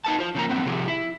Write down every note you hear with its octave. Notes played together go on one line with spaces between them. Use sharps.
D#4 B4 A5
F4 C5
C#3 F3 A#3 A#5
G2 E3 F3 B3 C4
C3 F3 G4 G#4
E4